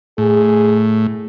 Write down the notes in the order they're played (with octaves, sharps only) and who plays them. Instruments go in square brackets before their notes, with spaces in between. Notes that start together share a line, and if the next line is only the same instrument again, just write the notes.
[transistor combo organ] A2 [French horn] G#4